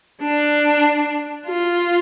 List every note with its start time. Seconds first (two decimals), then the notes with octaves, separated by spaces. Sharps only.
0.21 D4
1.47 F4